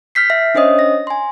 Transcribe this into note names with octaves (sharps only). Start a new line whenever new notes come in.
F6 G6 B6 C7
E5
C#4 D4 C5 C#5 D#5 D#6
A#6
G#5 C6